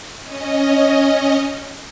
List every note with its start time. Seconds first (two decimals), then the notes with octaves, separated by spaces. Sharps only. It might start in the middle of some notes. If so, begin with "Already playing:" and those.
0.23 C#4 D#5